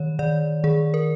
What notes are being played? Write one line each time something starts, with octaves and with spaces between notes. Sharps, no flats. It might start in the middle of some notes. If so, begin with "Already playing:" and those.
Already playing: D#3 C#5
D#3 D5
D#3 G#4
A#4